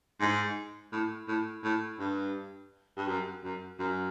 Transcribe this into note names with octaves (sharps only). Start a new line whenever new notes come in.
G#2
A2
A2
A2
G2
G2
F#2
F#2
F#2